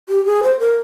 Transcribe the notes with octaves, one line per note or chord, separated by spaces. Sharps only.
G4
G#4
C5
A#4